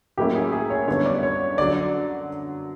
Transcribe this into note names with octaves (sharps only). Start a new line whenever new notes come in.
A2 F#3 A#3 C#4 E4 G4
G#4
G#4
C#5
F#2 D3 G3 B3 D4 C#5
D5
C#5
D3 F#3 D5